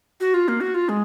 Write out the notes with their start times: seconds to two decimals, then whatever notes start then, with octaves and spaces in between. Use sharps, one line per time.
0.20 F#4
0.34 F4
0.48 A#3
0.61 F#4
0.74 F4
0.89 G#3